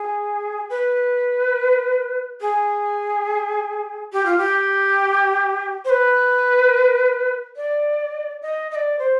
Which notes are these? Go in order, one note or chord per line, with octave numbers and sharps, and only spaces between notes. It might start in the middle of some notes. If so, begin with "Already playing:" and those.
Already playing: G#4
B4
G#4
G4
F4
G4
C5
B4
D5
D#5
D#5
D5
C5